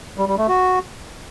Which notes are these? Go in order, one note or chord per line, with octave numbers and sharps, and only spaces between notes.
G3
G3
A3
F#4